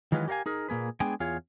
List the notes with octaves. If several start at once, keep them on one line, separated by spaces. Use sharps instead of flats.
D#3 E3 F#3 G#3 F4 B4
G4 A#4 C#5 F5 G#5
D#4 G#4 A#4
A#2 A#3 G#4 B4
G#3 B3 D4 G#4 G5 G#5
E2 F4 G#4 C#5